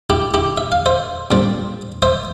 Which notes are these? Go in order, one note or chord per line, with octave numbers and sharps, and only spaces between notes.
E4 G4
E4 G4
E5
F5
C5 E5
A#2 G3 C4
C5 E5